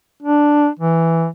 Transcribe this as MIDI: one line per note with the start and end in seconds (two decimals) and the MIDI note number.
0.23 0.68 62
0.79 1.27 52